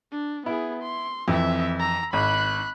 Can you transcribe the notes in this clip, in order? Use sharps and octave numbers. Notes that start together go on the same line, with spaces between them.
D4
B3 E4 G#4
C6
F2 E3 C4 E5
A#5 E6
G#1 B5 F#6